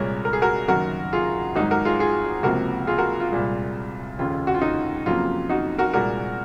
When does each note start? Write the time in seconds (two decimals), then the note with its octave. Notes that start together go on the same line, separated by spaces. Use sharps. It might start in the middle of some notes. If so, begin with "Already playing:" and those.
Already playing: C2 A#2 G#3 A#4 C#5
0.25 A#4
0.33 G#4
0.42 F#4 A#4
0.68 F#1 F#2 D#3 F#4 A#4
1.13 F4 G#4
1.55 G#1 G#2 F#3 D#4 F#4
1.71 F#4 A#4
1.85 F4 G#4
2.00 F4 G#4
2.43 C#2 C3 F3 A#3 F#4 A#4
2.87 F4 G#4
2.98 F#4 A#4
3.20 F4
3.31 C2 A#2 G#3
4.18 F1 D#2 C#3 F4
4.47 F#4
4.54 F4
4.62 D#4
5.06 F2 C#3 F#3 A#3 F4
5.49 D#4 F#4
5.79 F#4 A#4
5.93 C2 A#2 G#3 F#4 A#4